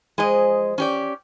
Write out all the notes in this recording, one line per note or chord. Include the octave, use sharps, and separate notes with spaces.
E2 F3 G#3 G#4 D#5
C#4 G4 D5